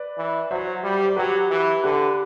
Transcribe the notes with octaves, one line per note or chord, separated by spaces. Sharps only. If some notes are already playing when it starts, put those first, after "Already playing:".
Already playing: B4 D5
E3
F#3 C5 E5
G3
C5
F#3 G4 B4
E3
D3 G4 B4